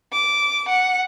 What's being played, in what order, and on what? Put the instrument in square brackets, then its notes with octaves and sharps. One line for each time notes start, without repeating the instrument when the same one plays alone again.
[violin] D6
F#5